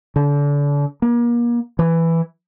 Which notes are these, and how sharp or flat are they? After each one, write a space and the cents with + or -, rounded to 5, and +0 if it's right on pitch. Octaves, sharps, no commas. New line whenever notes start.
D3 -35
A#3 +35
E3 +5